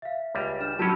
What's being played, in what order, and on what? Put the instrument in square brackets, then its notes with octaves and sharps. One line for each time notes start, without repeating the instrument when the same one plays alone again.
[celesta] E5 F5
[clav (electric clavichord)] C#2 G3
[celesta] D4 F6 E7
[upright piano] F#3 [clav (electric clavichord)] C#4 G4 [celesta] A5 B5 E6